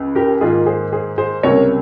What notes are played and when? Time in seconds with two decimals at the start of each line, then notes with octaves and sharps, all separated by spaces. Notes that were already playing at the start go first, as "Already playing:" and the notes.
Already playing: C#2 C#3
0.15 G4 A#4
0.41 G#2 D#3 A#3 F4 G#4
0.66 G#4 C5
0.92 G#4 C5
1.18 G#4 C5
1.43 C#2 C3 G3 A#3 A#4 C#5